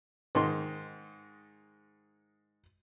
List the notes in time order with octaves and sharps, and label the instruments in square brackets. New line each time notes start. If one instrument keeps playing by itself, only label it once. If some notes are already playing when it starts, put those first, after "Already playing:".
[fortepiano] G#2 D#3 C6